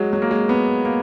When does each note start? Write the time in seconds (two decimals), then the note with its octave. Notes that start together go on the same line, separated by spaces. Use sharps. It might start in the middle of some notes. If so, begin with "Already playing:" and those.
Already playing: F#3 G#3
0.13 F#3
0.22 A#3
0.31 G#3
0.49 B3
0.85 A#3